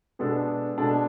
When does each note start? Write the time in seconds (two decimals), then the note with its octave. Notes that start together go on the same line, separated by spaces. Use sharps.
0.19 B2 G#3 B3 D4 A4
0.78 B2 G#3 D4 A4